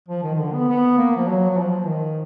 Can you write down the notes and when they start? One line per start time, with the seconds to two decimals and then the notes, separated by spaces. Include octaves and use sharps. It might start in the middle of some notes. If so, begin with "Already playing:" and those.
0.09 F3
0.23 D#3
0.34 D#3
0.39 D3
0.53 B3
0.68 B3
0.97 A#3
1.17 F3
1.28 F#3
1.50 F#3
1.57 F3
1.87 D#3